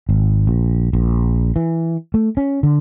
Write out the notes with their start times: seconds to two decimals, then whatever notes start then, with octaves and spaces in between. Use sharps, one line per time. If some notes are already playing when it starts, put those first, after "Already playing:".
0.09 G#1
0.47 A#1
0.93 A#1
1.56 E3
2.14 A3
2.37 C#4
2.63 D3